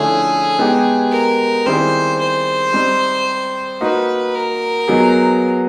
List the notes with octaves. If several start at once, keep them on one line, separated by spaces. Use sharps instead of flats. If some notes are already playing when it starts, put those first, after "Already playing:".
Already playing: D3 F3 A3 C#4 E4 G#4
G#3 B3 D#4 G4
A#4
D#3 G3 C4 E4 G#4 C5
C5
G3 C4 D#4
A#3 D#4 F#4 B4
A#4
F#3 B3 D#4 G#4